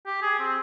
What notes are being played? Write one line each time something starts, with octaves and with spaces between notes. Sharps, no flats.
G4
G#4
C4